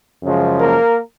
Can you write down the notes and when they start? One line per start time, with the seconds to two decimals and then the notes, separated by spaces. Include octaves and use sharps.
0.22 F#2 C#3 F3 G#3
0.60 A#3 A#4